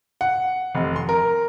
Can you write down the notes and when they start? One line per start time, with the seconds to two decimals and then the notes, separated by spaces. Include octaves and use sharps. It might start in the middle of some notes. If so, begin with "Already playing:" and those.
0.21 F#5
0.75 F1
0.96 C6
1.09 A#4